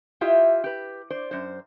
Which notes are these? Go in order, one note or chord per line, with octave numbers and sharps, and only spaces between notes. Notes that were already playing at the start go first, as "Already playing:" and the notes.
E4 F4 G4 D#5 E5
G4 B4
C5 D5
F#2 C5